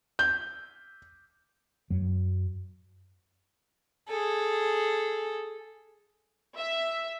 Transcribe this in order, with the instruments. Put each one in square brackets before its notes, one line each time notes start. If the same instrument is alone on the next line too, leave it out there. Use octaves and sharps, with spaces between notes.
[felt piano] G6
[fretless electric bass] F#2 F#3
[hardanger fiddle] G#4 A4
[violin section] E5